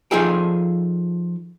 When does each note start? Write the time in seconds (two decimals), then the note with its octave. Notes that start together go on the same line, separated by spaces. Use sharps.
0.11 F3 D#4 F4 G#4 A4 G5